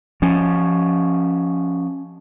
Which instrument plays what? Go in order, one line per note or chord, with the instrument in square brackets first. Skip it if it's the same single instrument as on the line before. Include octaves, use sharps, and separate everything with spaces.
[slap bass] F3 C#4